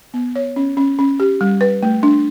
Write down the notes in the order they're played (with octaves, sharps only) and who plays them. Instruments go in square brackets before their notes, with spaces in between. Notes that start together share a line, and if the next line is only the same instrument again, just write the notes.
[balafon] B3
C#5
C#4
C#4
C#4
G4
G3
B4
A3
D4